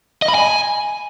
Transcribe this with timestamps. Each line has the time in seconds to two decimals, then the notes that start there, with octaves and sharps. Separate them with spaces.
0.22 D#5
0.28 B5
0.35 G#5